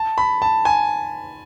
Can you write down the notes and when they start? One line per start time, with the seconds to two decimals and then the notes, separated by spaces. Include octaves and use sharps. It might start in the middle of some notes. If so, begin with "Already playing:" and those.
Already playing: A5
0.18 B5
0.42 A5
0.65 G#5